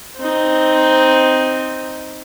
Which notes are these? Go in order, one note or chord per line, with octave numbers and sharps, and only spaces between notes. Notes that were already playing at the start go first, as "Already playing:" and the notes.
C4 D#4